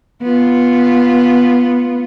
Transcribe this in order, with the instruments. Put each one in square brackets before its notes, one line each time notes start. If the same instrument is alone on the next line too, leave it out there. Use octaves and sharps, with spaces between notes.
[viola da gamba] B3 F4